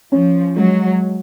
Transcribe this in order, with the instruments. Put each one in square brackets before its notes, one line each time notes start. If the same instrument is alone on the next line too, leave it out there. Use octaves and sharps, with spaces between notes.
[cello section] F3 [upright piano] C#4
[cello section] F#3 [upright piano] G#3